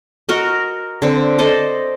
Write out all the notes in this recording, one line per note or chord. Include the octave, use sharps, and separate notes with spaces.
F#4 A#4 D#5
D3 C4
A4 C5 D5 D#5